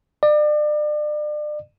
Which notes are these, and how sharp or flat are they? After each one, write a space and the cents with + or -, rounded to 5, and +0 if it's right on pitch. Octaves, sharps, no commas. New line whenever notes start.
D5 +35